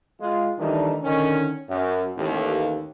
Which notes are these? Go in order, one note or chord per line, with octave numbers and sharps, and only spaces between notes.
G#3 F4
D#3 E3 G3 A3 D4 D#4
D3 D#3 C#4
F#2
A1 D#2